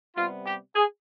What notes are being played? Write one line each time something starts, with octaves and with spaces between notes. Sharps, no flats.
C3 G3 B3 F4
G4
G#4